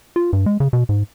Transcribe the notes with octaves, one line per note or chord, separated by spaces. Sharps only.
F4
G2
G#3
C#3
B2
G#2